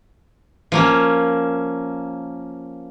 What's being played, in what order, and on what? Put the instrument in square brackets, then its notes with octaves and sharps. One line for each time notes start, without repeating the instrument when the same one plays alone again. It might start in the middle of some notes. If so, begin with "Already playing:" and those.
[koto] F3 A#3 C#4